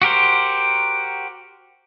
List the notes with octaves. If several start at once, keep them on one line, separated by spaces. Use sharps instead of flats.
F#4 G4 A#4 C5